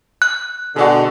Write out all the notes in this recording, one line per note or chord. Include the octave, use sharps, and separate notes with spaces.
F#6
B2 D3 G#3 F#4